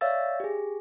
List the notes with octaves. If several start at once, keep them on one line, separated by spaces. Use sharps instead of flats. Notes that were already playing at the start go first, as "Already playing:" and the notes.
C#5 D5 E5 F5 E6 A6
G4 G#4